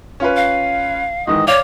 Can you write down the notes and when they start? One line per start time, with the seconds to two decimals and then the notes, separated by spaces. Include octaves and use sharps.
0.20 C#4 F4 B4
0.36 F5
1.27 G#2 D#3 E3 D#5
1.48 C#5 D5 F5